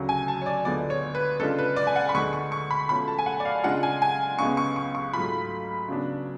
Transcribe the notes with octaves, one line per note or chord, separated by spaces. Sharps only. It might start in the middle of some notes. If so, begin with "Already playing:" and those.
Already playing: D2 C#3 F#3
G#5
A5
C#5
D5
D2 D3 G#3 B3 F4 D5
C#5
B4
C#3 G#3 D4 F4 A4
B4
D5
G#5
F#5
B5
D2 D3 G#3 C#6
C#6
C#6
B5
B2 A3 C#4 F4 B5
A5
G#5
F#5
D5
F5
C#3 G#3 D4 F4 F#5
G#5
G#5
C#2 C#3 G#3 B3 C#6
C#6
C#6
C#6
G#2 F#3 A3 F4 B5
C#3 F#3 B3 D4